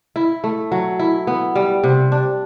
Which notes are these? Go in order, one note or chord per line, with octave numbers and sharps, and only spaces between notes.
E4
A3
F#3
E4
B3
G3
C3
D4